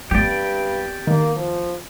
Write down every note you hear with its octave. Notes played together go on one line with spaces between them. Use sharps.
G2 B3 C4 G4 D5
D#3 A#3
F3